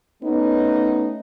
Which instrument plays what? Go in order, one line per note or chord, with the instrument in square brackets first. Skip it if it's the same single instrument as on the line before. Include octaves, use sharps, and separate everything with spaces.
[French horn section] A3 B3 C#4 D#4